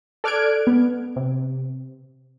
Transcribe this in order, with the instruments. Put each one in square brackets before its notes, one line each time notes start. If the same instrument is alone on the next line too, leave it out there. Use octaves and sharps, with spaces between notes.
[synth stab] A4 D5 F6 F#6 G#6 D7
B3
C3